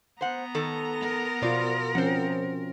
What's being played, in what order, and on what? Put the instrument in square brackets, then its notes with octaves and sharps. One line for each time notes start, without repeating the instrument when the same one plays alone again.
[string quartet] B3 A#5 [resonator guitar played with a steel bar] C5 F#5
[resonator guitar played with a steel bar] D#3 A4
[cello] A#4
[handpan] B2 F4 [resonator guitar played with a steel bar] C5 D5
[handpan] F3 C4 C#4 [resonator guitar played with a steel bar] C5 F#5